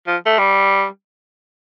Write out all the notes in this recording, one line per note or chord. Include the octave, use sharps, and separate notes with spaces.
F3
A3
G3